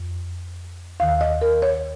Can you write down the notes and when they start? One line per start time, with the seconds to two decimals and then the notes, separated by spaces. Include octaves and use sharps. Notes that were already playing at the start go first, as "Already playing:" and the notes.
Already playing: F2
1.00 D#2 D#3 F5
1.21 D#5
1.41 A#4
1.62 C#5